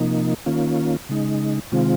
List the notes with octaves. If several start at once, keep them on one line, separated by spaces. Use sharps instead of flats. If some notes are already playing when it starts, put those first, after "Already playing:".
Already playing: C3 F3 A#3 D#4
D#3 A#3 C#4 F4
C#3 G#3 D#4
C3 D#3 G#3 C4 F4